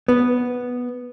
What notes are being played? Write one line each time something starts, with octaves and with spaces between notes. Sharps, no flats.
B3